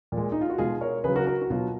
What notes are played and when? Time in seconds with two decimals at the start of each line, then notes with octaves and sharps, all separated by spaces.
0.12 A#2
0.17 G#3
0.32 D#4
0.41 F4
0.50 F#4
0.58 B2 G#3 F4 G#4
0.81 A#4 C#5
1.04 C#3 G#4 B4
1.08 F#3
1.15 F#4 A#4
1.27 F#4 A#4
1.42 F#4
1.50 B2 F#3 F4